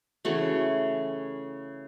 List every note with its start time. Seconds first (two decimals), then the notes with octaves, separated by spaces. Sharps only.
0.25 C#3 E3 A3 F#4